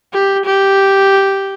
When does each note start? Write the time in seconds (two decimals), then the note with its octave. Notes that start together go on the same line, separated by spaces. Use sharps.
0.13 G4
0.46 G4